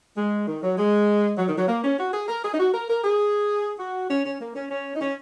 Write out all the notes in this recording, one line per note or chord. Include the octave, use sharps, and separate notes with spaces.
G#3
D#3
F#3
G#3
F#3
D#3
F#3
A#3
C#4
F#4
G#4
A#4
G#4
D#4
F#4
A#4
A#4
G#4
F#4
C#4
C#4
A#3
C#4
C#4
D#4
C#4